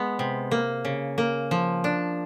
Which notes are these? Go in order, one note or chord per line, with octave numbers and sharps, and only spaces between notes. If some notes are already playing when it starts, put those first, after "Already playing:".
Already playing: G#3 B3
C3
A#3
C#3
A#3
F3
D4